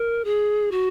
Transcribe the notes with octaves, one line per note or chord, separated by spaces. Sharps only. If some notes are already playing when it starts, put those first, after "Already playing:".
Already playing: A#4
G#4
F#4